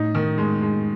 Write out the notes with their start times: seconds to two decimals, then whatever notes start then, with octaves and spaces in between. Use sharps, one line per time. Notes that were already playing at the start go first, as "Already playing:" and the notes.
Already playing: A2 D#4
0.15 D#3
0.38 G#3
0.62 G#3